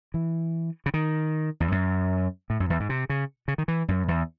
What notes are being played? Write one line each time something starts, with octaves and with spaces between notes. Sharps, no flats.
E3
C#3
D#3
E2
F#2
A2
F#2
E2
G#2
C3
C#3
C#3
D#3
E3
F#2
E2